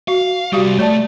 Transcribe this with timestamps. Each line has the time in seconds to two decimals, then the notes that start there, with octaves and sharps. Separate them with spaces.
0.08 F#4 F5
0.53 C2 G3 F#4 G4 F5
0.79 A3 C#5 D5 A5